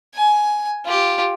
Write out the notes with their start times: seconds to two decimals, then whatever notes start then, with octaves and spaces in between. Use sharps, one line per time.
0.14 G#5
0.85 F4 G4